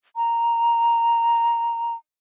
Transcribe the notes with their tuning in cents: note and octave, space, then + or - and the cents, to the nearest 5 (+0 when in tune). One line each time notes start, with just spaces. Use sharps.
A#5 -5